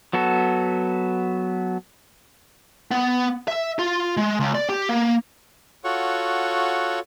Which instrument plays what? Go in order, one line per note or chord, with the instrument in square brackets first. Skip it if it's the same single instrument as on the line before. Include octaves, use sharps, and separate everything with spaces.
[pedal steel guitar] F#3 B3 F#4 A4
[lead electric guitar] B3
E5
F4
G#3
C#2
D5
G4
A#3
[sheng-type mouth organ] F4 F#4 A4 C#5 F#5 C#6